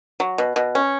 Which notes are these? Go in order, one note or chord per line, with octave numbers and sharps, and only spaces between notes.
F#3
B2
B2
C#4